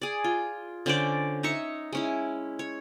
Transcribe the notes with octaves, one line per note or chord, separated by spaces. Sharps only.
G#4 D5
F4
D3 C#4 C5 D5
D#4 C#5 E5 C#6
G#3 C#4 E4
C#5